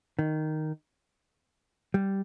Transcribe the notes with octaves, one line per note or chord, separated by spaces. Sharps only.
D#3
G3